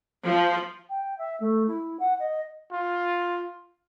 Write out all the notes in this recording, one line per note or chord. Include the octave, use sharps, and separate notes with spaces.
F3
G5
E5
A3
E4
F#5
D#5
F4